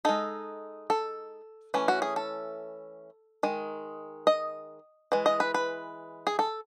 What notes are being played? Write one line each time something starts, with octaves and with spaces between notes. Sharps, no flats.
G#3 D#4 A4
A4
E3 A3 C#4
F#4
G#4
A4
D#3 G#3
D#5
E3 G#3
D#5
B4
B4
G#4
A4